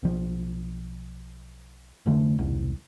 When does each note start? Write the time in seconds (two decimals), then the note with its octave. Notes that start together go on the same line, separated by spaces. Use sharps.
0.03 B1 F3
2.06 F1 F2 D3 A3
2.39 E1 C2